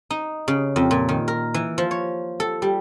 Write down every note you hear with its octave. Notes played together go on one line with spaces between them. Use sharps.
D#4
C#3
F2
A#2
D#3
A#4
E3
F3
C#5
A4
G3